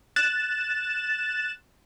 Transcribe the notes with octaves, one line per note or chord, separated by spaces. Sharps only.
F#6 A6 E7